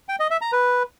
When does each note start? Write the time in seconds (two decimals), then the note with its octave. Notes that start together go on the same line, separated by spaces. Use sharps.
0.09 G5
0.20 D#5
0.30 E5
0.41 A#5
0.52 B4